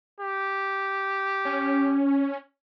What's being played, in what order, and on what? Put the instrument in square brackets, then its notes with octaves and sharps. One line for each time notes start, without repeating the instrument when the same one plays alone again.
[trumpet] G4
[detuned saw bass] C#4